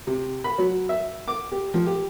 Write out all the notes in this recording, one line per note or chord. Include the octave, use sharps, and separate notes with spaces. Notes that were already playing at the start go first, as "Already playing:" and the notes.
C3
B5
F#3
E5
D6
G4
F3
G4